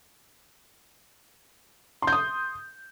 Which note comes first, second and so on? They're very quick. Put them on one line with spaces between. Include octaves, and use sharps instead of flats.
C6 G6 D#6